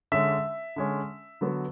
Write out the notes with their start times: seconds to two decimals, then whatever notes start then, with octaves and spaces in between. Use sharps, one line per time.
0.12 D3 G#3 C#4 E5
0.76 D3 G#3 C#4
1.41 D3 F#3 B3